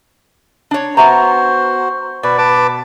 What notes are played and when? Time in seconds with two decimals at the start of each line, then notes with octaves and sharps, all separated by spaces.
0.71 D4 C#5
0.97 B3 F#4 C5 E5 A#5
2.23 B2 B4 D5
2.38 B4 A5 D6